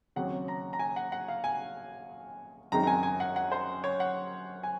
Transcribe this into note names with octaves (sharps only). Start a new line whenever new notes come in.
D#2 C#3 F#3 C4 F#5
A#5
A#5
G#5
F#5
F#5
F5
G#5
F#2 D#3 G#3 C4 D#4 A#5
A#5
G#5
G#5
F#5
F#5
C5
C#5
F#5
G#5